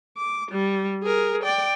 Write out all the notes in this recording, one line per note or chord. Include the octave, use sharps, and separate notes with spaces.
D6
G3
G#4 A#4
D5 G5